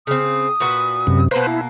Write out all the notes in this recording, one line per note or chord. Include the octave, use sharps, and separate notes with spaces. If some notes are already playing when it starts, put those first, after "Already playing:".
C#3 C4 D#6
A#2 F#4 B4
F#2 C3
B2 A#3 B4 C5
E4